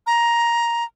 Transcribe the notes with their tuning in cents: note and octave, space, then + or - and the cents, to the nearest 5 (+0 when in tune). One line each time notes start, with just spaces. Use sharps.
A#5 +10